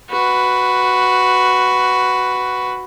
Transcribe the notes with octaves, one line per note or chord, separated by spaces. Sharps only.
F#4 B4